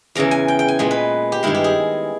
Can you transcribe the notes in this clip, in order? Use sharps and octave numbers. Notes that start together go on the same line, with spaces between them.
E2 C#3 E3 A#5
G#5
G5
G5
G#5
A#2 G#3 B3
B4
G4
G2 D#3 G#3 E4
G4
G#4